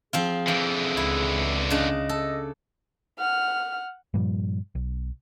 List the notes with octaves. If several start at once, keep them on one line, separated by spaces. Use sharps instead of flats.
F3 C4 F4 G#4
D3 E3 F3
C#2 E4
C#3 D4 D#5
A4
F#5 F6
G2 A#2 F3 G3
B1